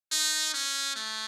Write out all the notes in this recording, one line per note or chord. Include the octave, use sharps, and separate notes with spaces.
D#4
C#4
A3